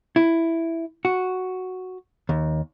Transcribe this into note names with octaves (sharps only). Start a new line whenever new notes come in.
E4
F#4
D#2